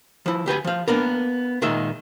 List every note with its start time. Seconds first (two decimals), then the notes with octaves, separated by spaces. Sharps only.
0.26 F3 E4
0.46 D2 G4 B4 G#5
0.64 F3 F5
0.88 A#3 B3 D4 A#4
1.62 A#2 D#3 G#3 E5